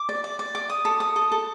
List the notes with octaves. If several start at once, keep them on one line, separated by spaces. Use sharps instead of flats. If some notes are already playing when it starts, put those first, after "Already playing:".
Already playing: D6
D5
D5
D5
D6
D#6
A4
D#6
A4
A4